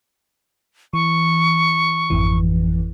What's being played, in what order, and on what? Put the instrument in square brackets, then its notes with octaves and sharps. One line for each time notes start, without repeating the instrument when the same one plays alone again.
[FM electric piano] E3 [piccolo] C#6
[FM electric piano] G#1 F2 E3